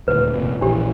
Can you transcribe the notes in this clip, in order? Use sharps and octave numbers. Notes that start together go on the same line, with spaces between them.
D#1 D2 B4
F1 A#2
A#1 E3 D4 G4